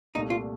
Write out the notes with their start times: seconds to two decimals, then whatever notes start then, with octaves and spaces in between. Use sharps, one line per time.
0.15 C2 A#2 A3 D#4
0.30 F4